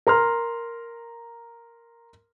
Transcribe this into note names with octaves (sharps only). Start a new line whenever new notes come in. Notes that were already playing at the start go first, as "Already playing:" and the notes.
A#4 A#5 C6 F6